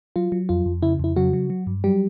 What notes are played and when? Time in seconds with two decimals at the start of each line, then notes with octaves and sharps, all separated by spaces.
0.16 F#3 F4
0.32 F#3
0.49 F2 F4
0.66 F2
0.82 C#3 E4
0.99 F2 E4
1.16 C#3 F#3 F#4
1.33 F#3
1.50 F#3
1.67 G2
1.84 F#3 G3 G4